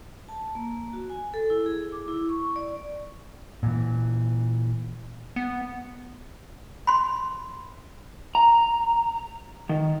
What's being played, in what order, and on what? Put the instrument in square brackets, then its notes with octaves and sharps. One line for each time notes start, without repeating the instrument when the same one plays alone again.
[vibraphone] A5
A#3
F#4
G#5
A4
E4
G#4
D6
E4
C#6
D5
[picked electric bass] A#2 E3
[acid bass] B3
[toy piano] B5 C6
[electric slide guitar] A#5
D#3